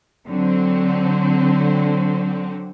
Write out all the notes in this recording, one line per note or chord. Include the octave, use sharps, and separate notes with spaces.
D3 F#3 C4